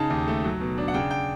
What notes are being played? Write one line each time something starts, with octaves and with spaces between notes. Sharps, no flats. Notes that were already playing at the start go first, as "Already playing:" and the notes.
Already playing: C#3 D#4 A5
D#2
A3
F#3
B2
D4
F#5
C#3 G5
G5